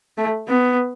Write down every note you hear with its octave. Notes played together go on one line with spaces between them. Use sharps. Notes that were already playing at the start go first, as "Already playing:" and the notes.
A3
B3